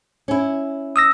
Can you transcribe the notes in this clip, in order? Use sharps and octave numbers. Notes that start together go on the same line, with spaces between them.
C#4 E4
D#6 E6 A#6